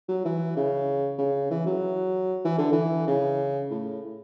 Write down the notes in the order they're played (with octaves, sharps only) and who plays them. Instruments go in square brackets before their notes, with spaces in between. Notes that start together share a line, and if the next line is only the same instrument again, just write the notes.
[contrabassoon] F#3
E3
C#3
C#3
E3
F#3
E3
D3
E3
C#3
A2